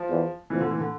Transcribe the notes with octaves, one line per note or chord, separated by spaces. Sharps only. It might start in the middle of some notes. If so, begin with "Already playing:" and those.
Already playing: F3
E2
F2 E3
D3
E3
D3